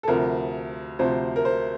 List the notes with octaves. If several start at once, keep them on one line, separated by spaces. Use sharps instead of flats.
A4
D2 C3 F3 A#4
D2 C3 F3 C5
A#4
C5